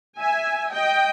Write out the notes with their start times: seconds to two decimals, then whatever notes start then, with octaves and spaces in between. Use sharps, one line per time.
0.20 E5 G#5
0.73 D#5 G5